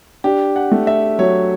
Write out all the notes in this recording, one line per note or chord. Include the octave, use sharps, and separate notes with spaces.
D4 G4
F#5
A3
E5
F#3 C#5